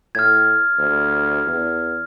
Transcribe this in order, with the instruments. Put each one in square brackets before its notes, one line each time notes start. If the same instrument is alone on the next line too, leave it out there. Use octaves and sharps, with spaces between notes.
[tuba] A2 [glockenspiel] F6 G#6
[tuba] D2
E2